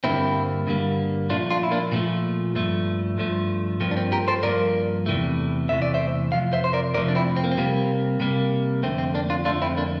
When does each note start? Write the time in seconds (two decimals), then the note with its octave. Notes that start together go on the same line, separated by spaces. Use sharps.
0.04 G2 D3 G3 A#3 C4 E4
0.67 G2 D3 G3 A#3
1.30 A#2 F3 A3 D4 F4
1.51 D4 F4
1.63 E4
1.71 A#3 D4
1.92 A#2 F3 A3
2.55 G2 F3 A3
3.18 G2 F3 A3
3.80 G2 F3 A#3 C4
3.91 D4
3.97 C4
4.12 G4 A#4
4.28 A4 C5
4.43 G2 F3 A#3 A#4 D5
5.06 E2 C3 E3 A3
5.69 E2 C3 E3 A3 E5
5.82 D5
5.94 C5 E5
6.32 F2 C3 F3 F5
6.53 C5 E5
6.64 C5
6.73 A#4 D5
6.94 F2 C3 F3 A3 A#4 D5
7.08 D4
7.15 C4 E4
7.36 C4
7.44 A#3
7.52 C4
7.58 C3 G3 A#3
8.20 C3 G3 A#3
8.83 F2 D3 A3 C4
8.98 C4
9.14 A#3 D4
9.30 D4 F4
9.45 F2 D3 A3 D4 F4
9.62 C4 E4
9.77 A#3 D4